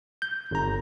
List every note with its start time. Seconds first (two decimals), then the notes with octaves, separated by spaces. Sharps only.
0.22 G6
0.51 G1 A#5